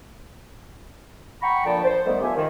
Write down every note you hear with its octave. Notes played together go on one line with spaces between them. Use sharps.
F#5 G5 A#5 B5 C#6
A#2 D3 F3 G5 A5
C5
D3 D#3 G3 A3 B3
G#2 F3 G4 E5 G#5
D#3